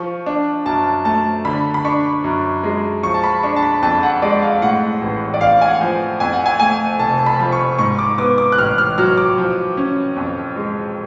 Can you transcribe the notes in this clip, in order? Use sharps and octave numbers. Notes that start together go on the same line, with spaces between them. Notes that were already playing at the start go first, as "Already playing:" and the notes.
Already playing: F3 C#6
D4
F#2 A5
A3 A5
D3 B5
B5
D4 C#6
F#2
G#3
F3 C#6
A5
B5
D4 C#6
A5
B5
F2 A5
F#5
G#3 D5
F5
A2 F#5
A1
D5
A1 F5
G#5
F#5
F3
F2 G#5
F#5
G#5
A3 G#5
F1 A5
A5
B5
F3
C#6
G#2 C#6
D6
B3 D6
D6
F#6
A1 F6
F6
F#3 F6
D6
F3
C#4
F2
G#3